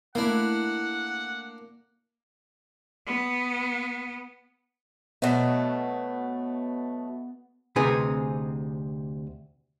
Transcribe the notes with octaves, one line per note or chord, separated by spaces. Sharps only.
A3 A#3 D4 E4 F#5
B3
B2 F#3 A3 B3
D2 C3 C4 D#4 G#4 B4